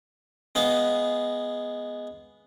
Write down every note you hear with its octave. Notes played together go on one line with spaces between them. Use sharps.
G#3 B3 F5